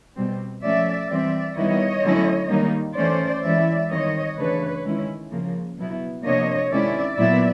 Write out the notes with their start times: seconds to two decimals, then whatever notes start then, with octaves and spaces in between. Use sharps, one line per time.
0.15 B2 G3 C4
0.62 F3 A3 C#4 D5 E5
1.09 E3 G3 C4 D5 E5
1.56 D#3 G3 B3 E4 C#5 D#5
2.03 D3 F#3 A3 C#4 E4
2.50 D#3 G3 A#3 D#4
2.96 E3 A3 C#4 C5 D5
3.43 E3 G#3 C#4 E4 D5 E5
3.90 D#3 G3 C4 C#5 D#5
4.37 C#3 E3 A3 D4 B4 C#5
4.85 D#3 G#3 C#4 E4
5.31 C#3 F3 A#3
5.78 B2 F#3 B3 E4
6.24 C3 F3 A#3 D4 C#5 D#5
6.72 C3 D#3 G#3 C#4 E4 D5 E5
7.18 A#2 F#3 B3 E4 D5 E5